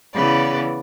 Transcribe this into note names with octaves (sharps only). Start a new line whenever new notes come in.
C#3 E3 B3 B4 D5